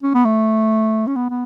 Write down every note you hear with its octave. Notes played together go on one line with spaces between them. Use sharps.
C#4
B3
A3
C#4
B3
B3